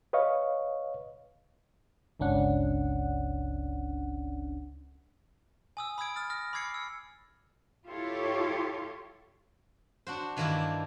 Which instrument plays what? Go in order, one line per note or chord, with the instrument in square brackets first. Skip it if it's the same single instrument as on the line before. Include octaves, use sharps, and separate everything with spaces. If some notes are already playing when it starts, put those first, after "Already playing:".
[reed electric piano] B4 C#5 D#5 F5 C#6
[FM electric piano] G1 C#2 C#4 D4 F#5
[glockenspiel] G#5 D#6 E6
B5 D#6 E6 G#6 D7
D#6 F6 A6
D#6 F6 A#6
B5 D6 E6 G#6 C7 C#7
E6 C#7
[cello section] E4 F4 G4 A4 C#5
[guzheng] D4 F#4 C5
G2 D#3 E3 A#3 D4 E4